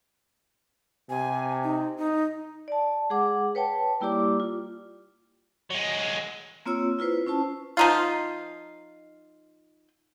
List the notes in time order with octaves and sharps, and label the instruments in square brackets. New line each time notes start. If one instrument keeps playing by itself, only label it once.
[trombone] C3 [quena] G#5
[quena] D#4
D#4
[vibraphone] D5 A5
G#3 G#4 F#5 D6
B4 C#5 G5 A5
G3 A#3 E4 G4 D5 D6
F4
[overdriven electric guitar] F#3 G#3
[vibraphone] A#3 C4 F4 C#5 E6
E4 F4 B4 C5
C#4 E4 C5 A5
[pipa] F3 D#4 F4